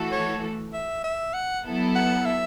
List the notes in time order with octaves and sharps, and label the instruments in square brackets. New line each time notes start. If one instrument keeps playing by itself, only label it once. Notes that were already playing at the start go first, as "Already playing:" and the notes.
Already playing: [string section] E3 A3 F#4 A4
[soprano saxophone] C#5
E5
E5
F#5
[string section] F#3 B3 E4 A4
[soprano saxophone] F#5
E5